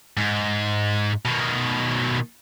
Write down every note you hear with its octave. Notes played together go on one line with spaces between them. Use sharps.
G#2
B2 D#3